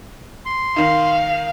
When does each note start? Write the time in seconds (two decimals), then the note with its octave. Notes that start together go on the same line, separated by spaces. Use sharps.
0.46 C6
0.76 D#3 D#4 F5